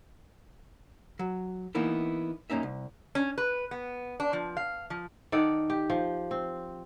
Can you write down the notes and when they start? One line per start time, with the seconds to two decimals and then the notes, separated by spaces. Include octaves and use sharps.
1.19 F#3
1.75 E3 A#3 B3 D#4 E4
2.50 F#2 A#3 C#4 D#4 E5
2.63 C2
3.15 C#4
3.38 B4
3.71 B3
4.20 D4
4.33 F3
4.57 F5
4.90 F3
5.32 D#3 A4 D5 F#5
5.70 G4
5.90 F3
6.31 C4